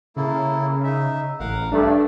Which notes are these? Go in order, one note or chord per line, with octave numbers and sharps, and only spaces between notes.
C#3 A#3 E4 A4
D#4 E5
A1 A#4 F5 F#5
G2 A3 D4 D5